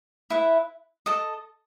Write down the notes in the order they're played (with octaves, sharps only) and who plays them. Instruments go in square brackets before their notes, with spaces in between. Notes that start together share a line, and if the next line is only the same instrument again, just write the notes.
[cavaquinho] E4 B4 E5
A4 D#5 A5